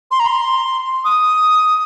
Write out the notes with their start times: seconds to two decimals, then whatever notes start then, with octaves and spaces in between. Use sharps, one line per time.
0.11 C6
0.20 A#5
0.28 C6
1.05 D#6